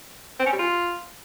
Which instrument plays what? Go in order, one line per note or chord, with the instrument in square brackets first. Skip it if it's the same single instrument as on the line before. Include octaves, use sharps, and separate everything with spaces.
[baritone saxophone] C4
C#4
G3
F4